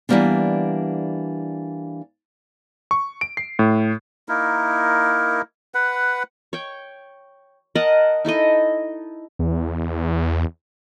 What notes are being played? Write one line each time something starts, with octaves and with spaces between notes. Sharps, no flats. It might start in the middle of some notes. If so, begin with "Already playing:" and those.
E3 F#3 G3 A#3 B3 D4
C#6
D7
C7
A2
A#3 D#4 E4 A#4
B4 F#5
C#5 G5
A#4 D#5 F#5 A5
D#4 E4 A4 D#5
E2